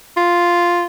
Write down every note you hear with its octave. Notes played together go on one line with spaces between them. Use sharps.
F4